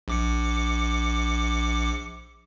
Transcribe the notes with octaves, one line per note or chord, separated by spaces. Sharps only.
A#1 D6 C#7